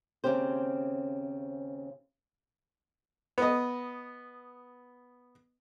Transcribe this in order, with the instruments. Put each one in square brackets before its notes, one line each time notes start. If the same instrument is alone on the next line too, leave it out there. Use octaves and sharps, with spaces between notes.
[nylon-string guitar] D#2 C#3 C4 C#4 G4 C5
[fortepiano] B3 D#5